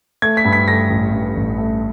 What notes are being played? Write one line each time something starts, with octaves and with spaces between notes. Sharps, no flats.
A3 G#6
B6
G2
B6
A3 A#6
A1
G2
A1
A3